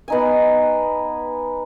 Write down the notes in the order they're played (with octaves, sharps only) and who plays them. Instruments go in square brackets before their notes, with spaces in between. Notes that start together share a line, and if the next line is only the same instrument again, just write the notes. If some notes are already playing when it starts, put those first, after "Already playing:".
[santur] B3 D#4 G#5